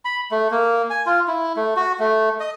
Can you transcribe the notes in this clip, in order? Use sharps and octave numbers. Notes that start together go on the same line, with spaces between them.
B5
A3
A#3
G#5
F4
E4
A3
F#4
A3
D#5